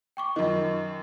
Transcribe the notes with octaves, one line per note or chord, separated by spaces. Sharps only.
G5 C#6 D6
F#2 D#3 F4 D#5